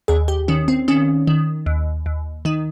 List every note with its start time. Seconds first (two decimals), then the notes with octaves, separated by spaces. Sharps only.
0.08 D#2 G#4
0.28 G4
0.48 D#3 C#4
0.68 C4
0.88 D#3 C#4
1.27 D#3
1.66 D#2
2.06 D#2
2.45 D#3 D#4